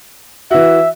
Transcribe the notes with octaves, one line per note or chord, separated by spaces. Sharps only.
E3 F#4 E5